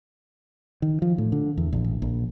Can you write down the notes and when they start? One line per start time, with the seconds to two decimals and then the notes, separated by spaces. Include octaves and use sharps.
0.82 D#3
1.02 F3
1.18 A2
1.32 D3
1.57 E2
1.73 A#1
1.84 A1
2.02 A#1